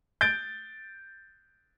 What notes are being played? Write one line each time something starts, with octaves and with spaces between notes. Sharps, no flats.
G6 A6 D7